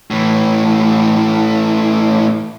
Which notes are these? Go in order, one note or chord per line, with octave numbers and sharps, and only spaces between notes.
A2 E3